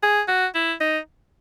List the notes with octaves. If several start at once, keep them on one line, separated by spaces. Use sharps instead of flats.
G#4
F#4
E4
D#4